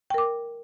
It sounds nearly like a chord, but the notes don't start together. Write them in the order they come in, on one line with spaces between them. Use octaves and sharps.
G5 A#4 D6